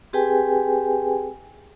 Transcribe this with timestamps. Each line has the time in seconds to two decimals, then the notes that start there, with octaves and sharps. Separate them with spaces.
0.13 C4 G4 G#4 B4 G5 G#5